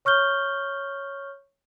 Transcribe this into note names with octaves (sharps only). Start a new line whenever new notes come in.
C#5 C#6 F6 G6 G7